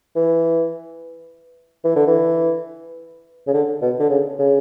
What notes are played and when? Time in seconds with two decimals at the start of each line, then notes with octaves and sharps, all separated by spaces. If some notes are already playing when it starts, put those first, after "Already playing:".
0.16 E3
1.84 E3
1.96 D3
2.07 E3
3.47 C#3
3.54 D3
3.82 B2
4.00 D3
4.10 C#3
4.39 C#3